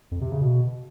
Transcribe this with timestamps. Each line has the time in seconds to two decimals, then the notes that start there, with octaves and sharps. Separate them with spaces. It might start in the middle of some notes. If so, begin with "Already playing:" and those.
0.11 F2
0.21 C3
0.31 C#3
0.41 B2